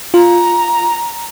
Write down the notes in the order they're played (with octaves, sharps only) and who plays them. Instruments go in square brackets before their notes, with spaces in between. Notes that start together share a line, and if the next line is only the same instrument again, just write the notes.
[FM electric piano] F4 [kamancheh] A#5